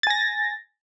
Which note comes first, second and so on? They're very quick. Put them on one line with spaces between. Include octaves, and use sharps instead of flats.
A6 G#5 A#6